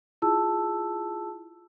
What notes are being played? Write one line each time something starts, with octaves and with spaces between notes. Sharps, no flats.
E4 F4 G#4 A5 E6